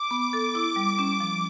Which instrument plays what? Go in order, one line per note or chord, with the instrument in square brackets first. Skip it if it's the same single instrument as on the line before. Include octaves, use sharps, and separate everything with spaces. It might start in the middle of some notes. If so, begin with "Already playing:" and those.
Already playing: [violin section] D6
[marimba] B3
A4
E4
G3
C#4
F3